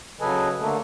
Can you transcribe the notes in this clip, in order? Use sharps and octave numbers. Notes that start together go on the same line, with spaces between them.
C#3 F#3 A4 B4 D#5 G#5
D3 A3 A#3 A4